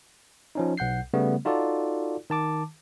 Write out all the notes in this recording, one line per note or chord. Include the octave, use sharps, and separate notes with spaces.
F3 C#4 D#4
B1 F#5 G6 C7
C#3 G3 A3 B3
D#4 F4 F#4 A4 D5
D#3 A5 D6